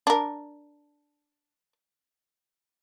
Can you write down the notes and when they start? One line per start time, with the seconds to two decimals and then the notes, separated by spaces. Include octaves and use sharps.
0.07 D4 A#4